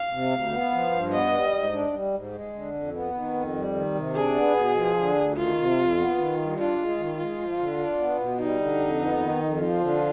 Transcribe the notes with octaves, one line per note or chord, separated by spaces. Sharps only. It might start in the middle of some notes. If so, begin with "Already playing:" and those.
Already playing: F5
C3
D2
B3
F3
G2
B3 D#5
G3
G#2
D4
G3
G#2
G#3
D3
F2
B3
D#3
F2
G3
D#3
C3
D4 G#4
B3
B2
F3
D3
D2
D#3 F4
C3
F2
B3
D#3
G2
D4 F4
G#3
D#3
G#3 F4
F3
D3
D4
B3
B2
G3 D#4
D3
F2
B3
D#3
F2
F3 F4
D3